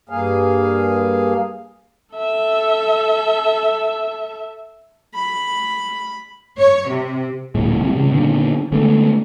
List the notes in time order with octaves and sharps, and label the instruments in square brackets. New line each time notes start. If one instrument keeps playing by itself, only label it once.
[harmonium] G2 A#3 G#4 F5
[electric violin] A4 E5
[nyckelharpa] B5
[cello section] C#5
C3
[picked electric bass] D1 A#2 G#3
C3 E3 G3
C#3 G#3
A#2 D3 D#3 B3
D3 G#3 A3 B3